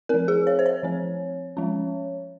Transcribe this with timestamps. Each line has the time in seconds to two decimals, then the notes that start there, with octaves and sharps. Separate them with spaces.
0.09 F3 C4 A#4
0.28 G#4
0.47 C#5
0.59 C5
0.66 C#5
0.83 F3 C4
1.57 F3 G#3 C#4